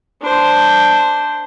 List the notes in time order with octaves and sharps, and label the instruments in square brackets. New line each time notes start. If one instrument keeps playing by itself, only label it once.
[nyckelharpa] D4 C5